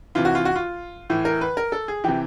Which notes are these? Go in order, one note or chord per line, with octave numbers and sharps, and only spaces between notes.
C3 E3 F4
F#4
F4
F#4
F4
A2 E3
A#4
B4
A#4
A4
G#4
C3 E3 G4